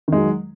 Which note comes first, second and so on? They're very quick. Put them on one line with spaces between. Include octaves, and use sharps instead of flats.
D#3 G#3 F#3